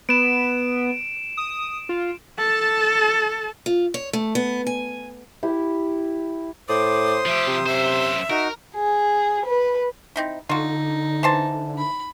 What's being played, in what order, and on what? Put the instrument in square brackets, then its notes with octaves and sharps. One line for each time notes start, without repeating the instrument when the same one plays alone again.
[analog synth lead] B3 [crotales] D7 E7
[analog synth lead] D#6
F4
[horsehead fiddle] A4 A5
[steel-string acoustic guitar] F4
C#5
A3
B3
G#5
[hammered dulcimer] E4 G4
[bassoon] A2 [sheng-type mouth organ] C5 C6 D#6 [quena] D6
[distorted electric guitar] F3 G4 [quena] E5
[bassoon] C3
[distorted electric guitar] F#2 C5 [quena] E5
[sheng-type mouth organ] D#4 F#4 [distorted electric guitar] A#4
[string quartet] G#4
B4
[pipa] C4 D#4 E4
[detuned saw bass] D3 [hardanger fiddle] D#4 [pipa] F4 F#4
[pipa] E3 C5 A5
[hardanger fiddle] B5